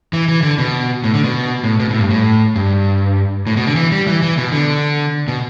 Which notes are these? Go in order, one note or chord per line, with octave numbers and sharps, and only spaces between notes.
E3
E3
D3
B2
A2
D3
B2
A2
B2
A2
G2
A2
G2
A2
B2
D3
E3
G3
E3
E3
B2
D3
B2